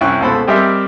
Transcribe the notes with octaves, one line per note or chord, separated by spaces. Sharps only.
C2 C#4 E4 G5 C#6 F#6
C#2 B2 A4 C5 B5
G3 C4 G4 A#4 D#5 E5